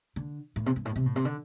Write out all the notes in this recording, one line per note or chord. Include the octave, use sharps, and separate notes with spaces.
D3
A2
C3
G2
A2
C3
A2
C3
D3